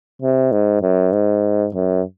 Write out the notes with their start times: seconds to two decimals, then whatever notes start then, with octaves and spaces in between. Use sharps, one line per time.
0.22 C3
0.52 G#2
0.82 F#2
1.13 G#2
1.74 F#2